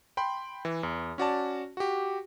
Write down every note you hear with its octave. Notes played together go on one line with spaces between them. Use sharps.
G5 B5 C6
E3
E2
C#4 F#4 D5 A5
F#4 G4